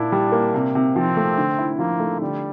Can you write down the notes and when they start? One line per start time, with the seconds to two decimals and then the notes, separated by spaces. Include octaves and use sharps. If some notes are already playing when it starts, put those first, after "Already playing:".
Already playing: A#2 D4 E4
0.12 G3
0.32 A#3
0.54 C3
0.75 C3
0.95 F3 C4
1.17 A3
1.38 D3
1.59 E4
1.79 F3 A#3
2.00 A3
2.21 D3 G3